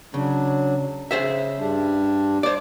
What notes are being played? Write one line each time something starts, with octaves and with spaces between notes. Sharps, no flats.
C#3 F#3 D4
C#3 G#4 C5 E5
G2 G3 D4
C5 D5